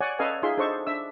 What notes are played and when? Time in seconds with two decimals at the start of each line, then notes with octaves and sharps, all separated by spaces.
0.01 C#5 D5 F#5 G#5
0.19 C#4 A4 B4 D#5 F5 G#5
0.43 D#4 F4 G#4 E5 C6
0.57 D4 A4 C5 D#5 C#6
0.87 D4 E5 E6